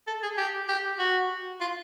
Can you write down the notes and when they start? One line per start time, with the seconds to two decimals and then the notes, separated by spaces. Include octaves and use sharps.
0.07 A4
0.23 G#4
0.37 G4
0.69 G4
0.99 F#4
1.61 F4